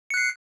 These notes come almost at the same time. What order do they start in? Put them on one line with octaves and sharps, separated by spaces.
C#7 F#6 C7